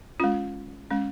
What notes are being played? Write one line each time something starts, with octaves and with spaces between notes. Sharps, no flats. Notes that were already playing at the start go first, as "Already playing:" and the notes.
G#3 C#4 F4
G#3 C#4